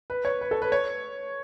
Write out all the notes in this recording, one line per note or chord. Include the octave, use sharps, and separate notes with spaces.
B4
C#5
B4
A4
B4
C#5